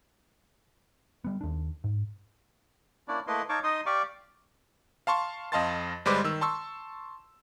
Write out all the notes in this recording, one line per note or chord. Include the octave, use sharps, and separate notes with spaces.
G3 B3
D#2 D4
G#2
A#3 C#4 D4 E4 D5
A3 A#3 E4 B4 D#5 C6
D#4 C#5 F5 A5 C#6 D6
D#4 D#5 C6 D#6
G4 D5 F5 C#6 D6
F5 A5 C6 C#6
F2 D#5 F5 A5 C6 A6
G1 G3 G#3 B4 C5 D6
D#3 E6
A5 C6 C#6 E6